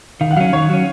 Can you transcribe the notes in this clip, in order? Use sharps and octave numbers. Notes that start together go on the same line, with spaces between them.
D#3 F5
F#5
F#3 C#4 F5
D#3 C#5
F#3 C#4